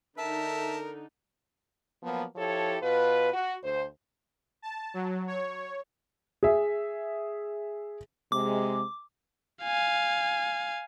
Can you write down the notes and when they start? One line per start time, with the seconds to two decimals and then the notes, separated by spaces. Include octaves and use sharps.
0.18 D3 D#4 A4 A#4 E5 A5
2.03 F3 F#3 A#3 B3
2.36 F3 E4 G4 A4 C#5
2.82 B2 F4 B4
3.33 F#4
3.63 D2 C5
4.62 A5
4.94 F#3
5.27 C#5
6.43 G#4 E5
8.32 C3 G#3 D6
9.63 F5 G#5